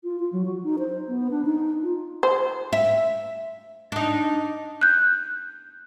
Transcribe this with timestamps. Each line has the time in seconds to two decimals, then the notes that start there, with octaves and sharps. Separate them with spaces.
0.04 F4
0.19 F4
0.32 F#3
0.46 F#4
0.63 D#4
0.79 C5
1.08 B3
1.31 D4
1.45 D#4
1.83 F4
2.23 C5
2.73 E5
3.92 D4 D#4
4.81 F#6 G6